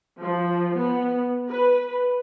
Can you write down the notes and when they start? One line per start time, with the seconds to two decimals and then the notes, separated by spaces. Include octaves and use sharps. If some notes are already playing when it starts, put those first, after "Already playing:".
0.21 F3
0.76 B3
1.50 B4